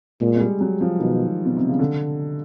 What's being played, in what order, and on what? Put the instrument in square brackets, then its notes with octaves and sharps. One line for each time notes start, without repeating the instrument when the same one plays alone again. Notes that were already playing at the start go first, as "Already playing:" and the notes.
[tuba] A#2 [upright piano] G#3
[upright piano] G#3
G3
F#3
F3
[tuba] B2 [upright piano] D#3
[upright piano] B2
C3
C#3
D3